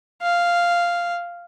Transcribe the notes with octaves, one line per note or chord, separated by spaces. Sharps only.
F5